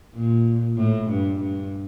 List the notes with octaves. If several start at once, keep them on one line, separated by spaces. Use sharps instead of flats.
A#2
A2
G2
G2